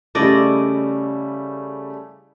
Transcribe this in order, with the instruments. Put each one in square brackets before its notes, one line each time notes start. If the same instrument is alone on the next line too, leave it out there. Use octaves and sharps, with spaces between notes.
[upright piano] C#3 G3 A3 [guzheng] E4 D5 D#5